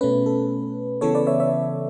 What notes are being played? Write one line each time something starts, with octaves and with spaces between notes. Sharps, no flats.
B2 A3 C#4 B4
A4
C#3 E3 B3 A4 C#5
B4 D5
C#5 E5
C#5 E5